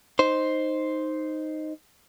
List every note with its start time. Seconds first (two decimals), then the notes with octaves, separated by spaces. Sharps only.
0.19 D#4 C5